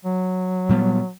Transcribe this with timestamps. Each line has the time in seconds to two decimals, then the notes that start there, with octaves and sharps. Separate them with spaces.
0.05 F#3
0.69 A#2 G3 B3